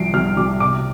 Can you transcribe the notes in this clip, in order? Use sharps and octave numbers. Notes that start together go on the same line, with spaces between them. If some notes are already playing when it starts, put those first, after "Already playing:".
Already playing: C2 F3 C7 D7
C2 F6
C2 D6
C3 D6